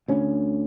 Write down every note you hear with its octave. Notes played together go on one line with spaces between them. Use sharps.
D2 D3 C#4